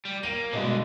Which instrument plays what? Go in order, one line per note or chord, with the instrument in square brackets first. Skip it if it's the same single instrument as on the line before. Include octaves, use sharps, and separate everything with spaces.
[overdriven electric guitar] G3
[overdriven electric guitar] A#3 [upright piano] D#7
[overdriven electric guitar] G2 D3 [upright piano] B2 G#3